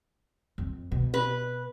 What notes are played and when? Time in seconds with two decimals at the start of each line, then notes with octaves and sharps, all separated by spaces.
0.58 F2
0.92 B2
1.14 B4